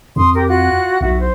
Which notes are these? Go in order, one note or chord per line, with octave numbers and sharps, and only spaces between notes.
F2 C6 D#6
G4 A#4
F4 F#4 F#6
B1 E4 F#4
C5